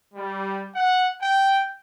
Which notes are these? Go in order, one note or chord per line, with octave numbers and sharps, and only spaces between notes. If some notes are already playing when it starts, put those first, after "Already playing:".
G3
F#5
G5